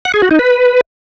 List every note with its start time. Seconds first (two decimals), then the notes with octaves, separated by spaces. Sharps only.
0.05 F#5
0.14 G#4
0.22 F#4
0.31 D#4
0.39 B4